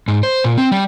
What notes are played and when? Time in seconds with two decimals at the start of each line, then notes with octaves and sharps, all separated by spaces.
0.08 G#2
0.23 C5
0.44 A#2
0.57 C4
0.72 G3